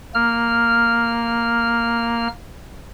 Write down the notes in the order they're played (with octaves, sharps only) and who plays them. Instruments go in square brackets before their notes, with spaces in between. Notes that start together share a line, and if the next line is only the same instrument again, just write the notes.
[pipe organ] A#3 F6